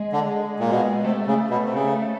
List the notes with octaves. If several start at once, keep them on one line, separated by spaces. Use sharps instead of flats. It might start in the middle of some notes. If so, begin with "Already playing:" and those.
Already playing: G#3
D3
A#2
B2
C3 A3
C#3
B2
C3
C#3